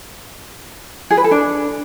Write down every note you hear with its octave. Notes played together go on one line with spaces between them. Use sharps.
G#4
B4
A4
D4